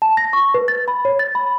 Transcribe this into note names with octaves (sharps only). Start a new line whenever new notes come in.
A5
A#6
C#6
B4
A6
B5
C#5
A6
B5